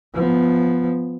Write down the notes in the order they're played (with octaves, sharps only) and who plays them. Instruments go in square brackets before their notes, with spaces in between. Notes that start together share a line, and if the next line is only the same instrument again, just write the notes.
[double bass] F3 B3